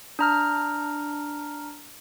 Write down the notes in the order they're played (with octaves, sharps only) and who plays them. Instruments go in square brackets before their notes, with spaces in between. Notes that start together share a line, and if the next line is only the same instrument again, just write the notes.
[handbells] D4 A#5 F6